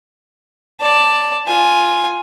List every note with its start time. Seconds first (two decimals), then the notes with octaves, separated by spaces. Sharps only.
0.81 D5 A5
1.47 F4 G#5